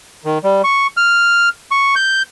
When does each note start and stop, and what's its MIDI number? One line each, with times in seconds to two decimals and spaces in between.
0.25 0.38 51
0.44 0.62 55
0.64 0.87 85
0.97 1.49 89
1.71 1.95 85
1.96 2.22 91